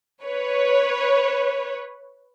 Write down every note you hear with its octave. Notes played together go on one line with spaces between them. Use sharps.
B4 C#5